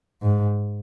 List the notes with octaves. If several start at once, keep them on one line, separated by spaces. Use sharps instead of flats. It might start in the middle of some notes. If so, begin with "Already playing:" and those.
G#2